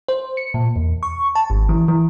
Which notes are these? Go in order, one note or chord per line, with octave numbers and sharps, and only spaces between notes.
C5
C#7
A#2
E2
C#6
A5
G#1
E3
E3